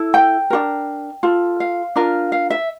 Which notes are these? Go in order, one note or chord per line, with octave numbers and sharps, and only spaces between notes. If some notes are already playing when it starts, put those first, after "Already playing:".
Already playing: E4 A4
G5
D4 F4 A#4
F4 A4
F5
D4 F4 A#4
F5
E5